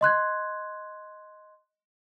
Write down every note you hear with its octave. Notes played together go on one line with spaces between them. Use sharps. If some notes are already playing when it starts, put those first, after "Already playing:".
D#5 C6 F#6 G#6